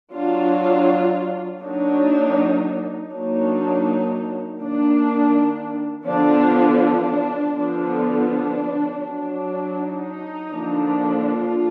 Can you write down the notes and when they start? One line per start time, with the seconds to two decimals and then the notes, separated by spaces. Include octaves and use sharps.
0.12 F#3 D4 F4
1.61 F#3 A#3 D4 D#4
3.09 F#3 A#3 D4 D#4
4.58 D#3 A#3 D4
6.06 D3 F3 B3 D4
6.80 D4
7.55 D3 F3 B3 D4
8.29 D4
9.04 F#3 D4
9.78 D#4
10.52 D3 F3 A#3 D4
11.26 F4